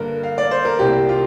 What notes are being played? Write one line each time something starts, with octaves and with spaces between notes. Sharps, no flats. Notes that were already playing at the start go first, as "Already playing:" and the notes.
Already playing: G2 D3 A#3 A#4
F5
D5
C5
A#4
C2 C3 A#3 G4
F4